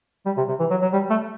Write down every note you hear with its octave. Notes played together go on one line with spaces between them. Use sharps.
G3
C3
C3
E3
F#3
F#3
G3
A3